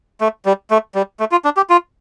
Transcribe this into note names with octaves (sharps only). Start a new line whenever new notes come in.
A3
G3
A3
G3
A3
F4
D4
G4
F4